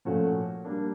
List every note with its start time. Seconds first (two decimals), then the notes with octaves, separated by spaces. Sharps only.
0.05 A#2 F3 A3 C#4 F#4
0.65 G3 A#3 D4